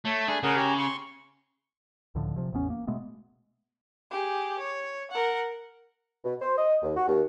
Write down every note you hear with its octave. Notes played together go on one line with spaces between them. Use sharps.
A3 C#5
A3 D4 G#4 B5
C#3 G#4 A#4 F#5
G4 G#5 A#5
C6 C#6
C#2 A2 D3 F3
D1 C3 F3
A1 E2 B3 C#4
A#3
B2 G#3 A3 B3
G4 G#4
C#5
A#4 F#5
B2
C5
D#5
D#2
F#4
D#2